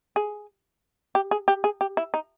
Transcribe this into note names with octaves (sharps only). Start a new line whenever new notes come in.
G#4
G4
G#4
G4
G#4
G4
E4
D#4